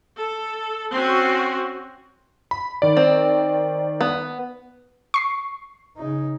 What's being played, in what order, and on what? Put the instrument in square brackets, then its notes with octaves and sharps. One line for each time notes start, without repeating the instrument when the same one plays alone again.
[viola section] A4
C4 C#4 F#4
[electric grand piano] B5
D#3 D5
[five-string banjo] C4
B3
[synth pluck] C#6 C7
[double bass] C#3 D#4